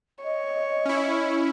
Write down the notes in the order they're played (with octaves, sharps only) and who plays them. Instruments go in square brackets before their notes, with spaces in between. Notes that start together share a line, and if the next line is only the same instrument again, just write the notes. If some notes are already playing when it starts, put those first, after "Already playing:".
[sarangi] C#5 [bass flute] D#5
[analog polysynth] C#4 E4